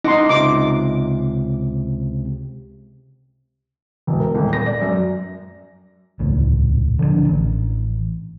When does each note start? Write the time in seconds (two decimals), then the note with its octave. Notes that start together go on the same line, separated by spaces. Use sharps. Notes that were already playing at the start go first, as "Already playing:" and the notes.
0.04 D#4 F#5 C6 D6 A#6
0.29 C#2 C3 D6
4.07 E1
4.20 A#4
4.35 D#1
4.53 A#6
4.66 D5
4.81 F#2
6.20 D#1 C#2 A2
6.99 D3 F3 A#3 D4
7.25 A1